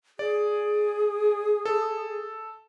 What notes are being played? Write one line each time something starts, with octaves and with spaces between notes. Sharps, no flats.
G#4 D5
A4